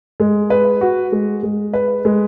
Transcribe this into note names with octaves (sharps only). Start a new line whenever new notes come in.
G#3
B4
F#4
G#3
G#3
B4
G#3